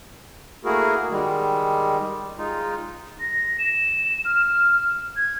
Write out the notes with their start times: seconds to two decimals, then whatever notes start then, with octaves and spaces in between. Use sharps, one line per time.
0.65 A3 A#3 E4 F#4 G#4 A#4
1.10 D#3 G3 G#3
2.38 G#3 D#4 F4
3.20 A#6
3.59 E7
4.25 F6
5.17 G#6